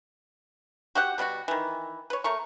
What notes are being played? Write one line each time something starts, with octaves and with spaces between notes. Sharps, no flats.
F#4 G4 F#5
B2 G3 E4 F#4
D#3 E3
B4 C#5
A3 A#4 C#6